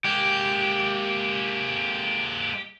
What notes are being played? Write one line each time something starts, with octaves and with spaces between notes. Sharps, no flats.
G#3 A#3 G4